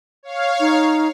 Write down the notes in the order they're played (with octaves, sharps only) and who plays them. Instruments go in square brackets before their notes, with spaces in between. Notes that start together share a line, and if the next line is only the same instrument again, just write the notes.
[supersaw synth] C#5 F5
[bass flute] D#4